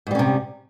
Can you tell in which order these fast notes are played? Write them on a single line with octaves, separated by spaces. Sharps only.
G#2 G3 C#4 C3